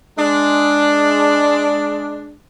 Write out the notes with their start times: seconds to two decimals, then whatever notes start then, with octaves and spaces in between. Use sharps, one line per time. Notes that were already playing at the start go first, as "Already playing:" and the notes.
0.18 G#3 D4